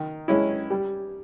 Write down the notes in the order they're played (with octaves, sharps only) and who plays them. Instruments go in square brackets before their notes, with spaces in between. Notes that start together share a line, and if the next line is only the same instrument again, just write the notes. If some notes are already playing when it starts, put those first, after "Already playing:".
Already playing: [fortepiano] D#3
G#3 C#4 E4
G3